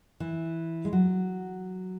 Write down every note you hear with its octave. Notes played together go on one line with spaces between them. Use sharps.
E3
G#3
F#3